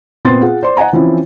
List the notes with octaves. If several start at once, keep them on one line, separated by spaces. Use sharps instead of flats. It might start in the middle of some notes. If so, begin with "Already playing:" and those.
A#2 B3 C4 C6 A6
F4 G#4 F#5
C5 D5 C6
D#5 F#5 G#5 A#5
E3 F3 C4 C#4 E4